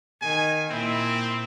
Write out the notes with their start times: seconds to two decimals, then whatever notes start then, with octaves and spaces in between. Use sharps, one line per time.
0.22 D#3 G#5
0.70 A#2 C4 E4